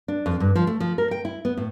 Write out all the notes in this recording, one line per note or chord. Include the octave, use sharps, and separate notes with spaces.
D4
F2
G2
F3
A3
F3
A#4
G5
E4
B3
A2